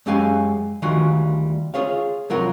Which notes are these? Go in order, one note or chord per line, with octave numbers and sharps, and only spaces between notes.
F#2 G#3 C#4 G4 F5 G#5
D2 D#3 G3 F4 F#4 G#5
F4 G#4 C#5 F5
C2 F#3 F4 A#4 F#5